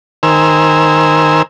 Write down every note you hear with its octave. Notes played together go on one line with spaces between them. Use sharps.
D#3 A#4 C5 G#5 E6